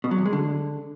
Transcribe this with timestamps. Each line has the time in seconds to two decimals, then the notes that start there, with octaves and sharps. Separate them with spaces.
0.04 B2
0.11 F#3
0.18 E2
0.25 G#3
0.33 D3